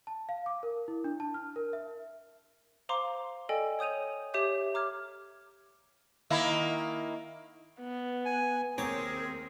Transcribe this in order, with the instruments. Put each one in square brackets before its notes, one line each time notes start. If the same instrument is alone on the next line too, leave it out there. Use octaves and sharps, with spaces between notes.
[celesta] A5
F5
D6
A#4
E4
D4
A5
F6
A#4
E5
[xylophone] C5 F5 A#5 C6 D6
A4 D5 D#5 G5 G#5
C#5 D#6 G6 D#7 F7
G4 C#5 E5 D6 G6
A#5 D6 F6 G#6
[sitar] D#3 A#3 E4
[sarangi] B3
[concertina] G#5
[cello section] D#2 A#4 C5 [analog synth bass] C4 [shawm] G#4 [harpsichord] C#5 A#5 D6